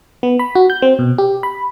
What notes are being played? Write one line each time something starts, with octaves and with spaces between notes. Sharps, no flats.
B3
B5
F#4
G6
C4
B2
G4
B5